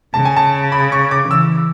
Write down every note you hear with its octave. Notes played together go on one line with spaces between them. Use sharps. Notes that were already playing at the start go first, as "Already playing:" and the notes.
C#3 A5
G#5
A5
B5
C#6
D6
E3 E6